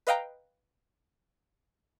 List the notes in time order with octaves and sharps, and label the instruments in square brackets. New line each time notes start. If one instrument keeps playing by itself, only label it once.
[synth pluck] B4 D#5 F5 G5 A#5